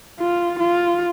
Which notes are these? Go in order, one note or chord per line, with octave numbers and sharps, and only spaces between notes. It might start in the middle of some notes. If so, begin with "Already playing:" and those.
F4
F4